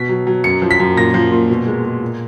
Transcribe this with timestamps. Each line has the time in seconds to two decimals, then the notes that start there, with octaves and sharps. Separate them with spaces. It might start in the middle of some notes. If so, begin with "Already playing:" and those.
Already playing: B2 B6
0.09 F#3
0.27 F#3
0.44 F#2 C#7
0.62 F3
0.71 B6
0.80 F#2
0.97 A#2 A#6
1.14 F3
1.32 A#2
1.50 B2
1.67 G#3
1.84 G#3
2.01 A#2